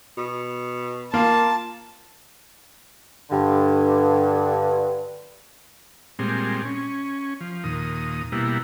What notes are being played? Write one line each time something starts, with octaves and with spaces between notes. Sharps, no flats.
B2
A#3 F4 A5
G2 D3
A#2 G3 G#3 C4
C#4
F3
D#2 A#2 D#6
B2 G3 A#3 E4